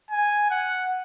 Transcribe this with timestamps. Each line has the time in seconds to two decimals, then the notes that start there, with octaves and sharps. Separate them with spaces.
0.11 G#5
0.51 F#5